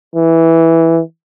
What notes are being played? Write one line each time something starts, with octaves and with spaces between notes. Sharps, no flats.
E3